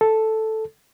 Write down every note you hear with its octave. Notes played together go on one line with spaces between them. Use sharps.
A4